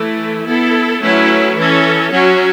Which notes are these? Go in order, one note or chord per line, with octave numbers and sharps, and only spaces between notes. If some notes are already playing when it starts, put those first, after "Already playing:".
Already playing: E3 A3 E4
B3 E4 A4
F#3 A3 C#4 E4 B4
E3 C#4 A4
F#3 C#4 F#4